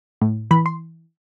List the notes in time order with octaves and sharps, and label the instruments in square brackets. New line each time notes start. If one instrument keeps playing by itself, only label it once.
[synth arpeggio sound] A2
E3 B5
C6